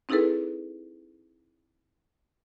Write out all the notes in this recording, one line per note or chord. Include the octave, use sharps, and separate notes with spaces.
C4 D#4 E4 G#4 A4 B4